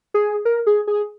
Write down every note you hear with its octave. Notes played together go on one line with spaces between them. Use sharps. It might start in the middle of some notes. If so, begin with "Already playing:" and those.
G#4
A#4
G#4
G#4